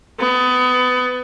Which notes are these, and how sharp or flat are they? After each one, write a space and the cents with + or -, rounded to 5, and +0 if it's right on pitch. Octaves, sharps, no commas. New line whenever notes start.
B3 +25